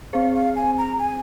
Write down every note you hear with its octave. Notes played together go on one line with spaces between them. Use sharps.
C4 G#4 C5 F5
F5
G#5
A#5
G#5